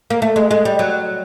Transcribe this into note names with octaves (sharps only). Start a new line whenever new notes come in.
A#3
A3
G#3
G#3
G3
F#3